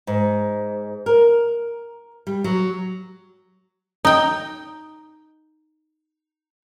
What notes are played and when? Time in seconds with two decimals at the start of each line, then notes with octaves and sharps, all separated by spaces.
0.07 G#2
1.06 A#4
2.27 G3
2.44 F#3
4.05 D#4 G5